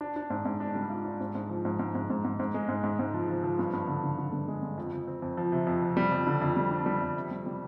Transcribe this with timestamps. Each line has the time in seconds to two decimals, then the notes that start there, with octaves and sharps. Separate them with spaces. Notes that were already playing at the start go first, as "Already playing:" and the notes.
0.01 D4
0.16 D4
0.30 G#2
0.45 G#2
0.60 D4
0.75 G3
0.90 F4
1.05 D4
1.20 G#2
1.35 G#2
1.50 F3
1.65 G#2
1.79 G#2
1.95 G#2
2.10 G#2
2.24 G#2
2.39 G#2
2.54 G#3
2.69 G#2
2.83 G#2
2.99 G#2
3.14 F3
3.28 F3
3.44 F3
3.59 G2
3.73 G2
3.88 D3
4.03 D3
4.18 D3
4.33 G2
4.48 G#3
4.63 G2
4.78 F2
4.93 F2
5.07 C4
5.22 F2
5.37 F3
5.52 C3
5.67 F2
5.82 F3
5.97 G3
6.12 F2
6.27 D3
6.42 F2
6.57 G3
6.71 D4
6.86 G3
7.02 F2
7.16 C3
7.31 G3
7.46 G3